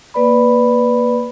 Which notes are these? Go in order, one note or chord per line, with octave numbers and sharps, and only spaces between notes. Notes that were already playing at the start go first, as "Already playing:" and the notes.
A#3 B4 D5 B5